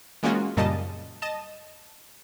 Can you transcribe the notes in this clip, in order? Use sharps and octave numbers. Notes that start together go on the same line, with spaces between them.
E3 G#3 A#3 C#4 F4 F#4
F#2 A#2 C#3 G3 D#5 A5
D#5 A5 E7